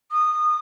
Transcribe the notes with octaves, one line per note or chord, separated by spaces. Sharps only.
D#6